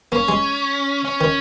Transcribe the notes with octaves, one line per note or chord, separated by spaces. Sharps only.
A#3 C#4
G#3
C#4
D#3